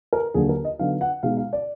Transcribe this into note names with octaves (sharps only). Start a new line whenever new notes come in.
A#4
D#2 D3 F#3 A#3 G#4
A#4
D#5
D3 F#3 B3 D#4 F5
F#5
B2 G#3 D#4 F5
F5
D5